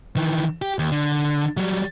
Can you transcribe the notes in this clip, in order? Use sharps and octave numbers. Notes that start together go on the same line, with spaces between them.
D#3 E3
G4
D#2
D3
F#3 G3